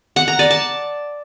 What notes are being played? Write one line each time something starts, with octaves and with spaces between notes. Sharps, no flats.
F#5
A#5
D5
A5